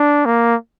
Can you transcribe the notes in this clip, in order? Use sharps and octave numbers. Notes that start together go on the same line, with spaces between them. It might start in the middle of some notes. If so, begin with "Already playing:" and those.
Already playing: D4
A#3